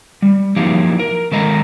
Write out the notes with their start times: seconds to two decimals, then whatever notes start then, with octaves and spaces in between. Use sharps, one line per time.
0.22 G3
0.56 F3 F#3 A#3 D#4 E4 G4
0.99 A#4
1.32 D#3 G#3 A4 A#4 D#5 A#5